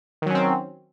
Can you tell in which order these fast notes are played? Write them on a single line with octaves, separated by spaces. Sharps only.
D#3 F#3 C#4 C4